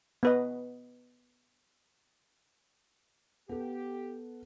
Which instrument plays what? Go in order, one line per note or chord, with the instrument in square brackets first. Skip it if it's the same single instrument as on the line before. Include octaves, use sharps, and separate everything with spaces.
[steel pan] B3 B4 D#5
[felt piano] B3 A4 [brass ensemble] G4